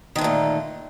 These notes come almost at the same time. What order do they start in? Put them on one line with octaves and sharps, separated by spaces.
D#3 D3 A3 A#2